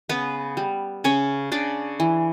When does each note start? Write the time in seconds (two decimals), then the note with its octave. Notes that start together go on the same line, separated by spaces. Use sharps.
0.09 C#3 B3 B4
0.57 G3
1.04 C#3 C#4 C#5
1.52 C#3 D4 D5
2.00 E3